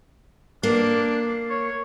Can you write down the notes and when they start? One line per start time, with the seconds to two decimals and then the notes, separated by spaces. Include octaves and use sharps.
0.63 A#3 D4
1.50 C#5